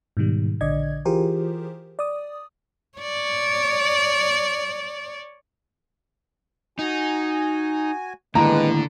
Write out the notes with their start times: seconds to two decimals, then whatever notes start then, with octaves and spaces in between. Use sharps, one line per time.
0.17 G#2 B2 D#3 G3
0.61 A#1 D3 D5 D#5 G#6
1.05 E3 F4 G4 G#4 A#4 C5
1.99 D5 D#6
2.98 C#5 D5
6.79 D#4 F#4 G#5
8.35 D#2 A2 D3 G#3 B4 A#5